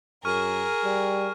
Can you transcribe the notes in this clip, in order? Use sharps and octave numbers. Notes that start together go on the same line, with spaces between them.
F#2 G#4 A#4 C#6 F6 D#7
G3